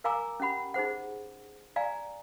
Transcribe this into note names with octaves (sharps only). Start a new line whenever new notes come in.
A#4 F5 G#5 A#5 D6 E6
C#4 G4 F#5 B5
D#4 G#4 C5 F#5
D5 F5 G#5 A#5